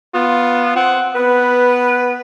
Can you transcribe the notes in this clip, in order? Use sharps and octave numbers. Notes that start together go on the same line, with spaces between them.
B3 F4
C4 F#5
B3 B4